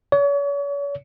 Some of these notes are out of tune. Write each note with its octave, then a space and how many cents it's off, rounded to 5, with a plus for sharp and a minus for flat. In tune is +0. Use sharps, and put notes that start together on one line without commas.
C#5 +40